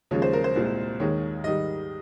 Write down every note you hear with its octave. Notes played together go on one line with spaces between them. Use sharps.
D#2 C#3 F3 G#3 C#5
C5
A#4
C5
C2 A#2 G#3
D#2 D#3 G#3 C#5
G#2 D#3 G3 D#5